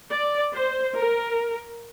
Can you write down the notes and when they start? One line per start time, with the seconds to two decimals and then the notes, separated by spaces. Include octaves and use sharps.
0.10 D5
0.53 C5
0.96 A#4